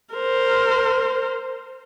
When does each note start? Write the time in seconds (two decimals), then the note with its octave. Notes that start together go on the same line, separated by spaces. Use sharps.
0.14 A#4 C5